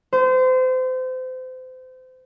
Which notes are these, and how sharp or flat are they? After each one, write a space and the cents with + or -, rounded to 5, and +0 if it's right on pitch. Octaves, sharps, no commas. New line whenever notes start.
C5 -30